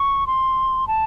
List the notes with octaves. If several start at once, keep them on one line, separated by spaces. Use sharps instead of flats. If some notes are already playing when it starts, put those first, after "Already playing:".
Already playing: C#6
C6
A5